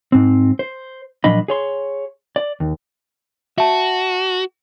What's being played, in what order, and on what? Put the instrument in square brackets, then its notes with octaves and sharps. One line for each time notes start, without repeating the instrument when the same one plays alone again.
[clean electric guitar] G#2 C4
C5
A#2 F3 F#3 D4 D#5 B5
G#4 C#5 C6
D5
D#2
[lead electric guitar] F#4 [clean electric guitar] E5 A5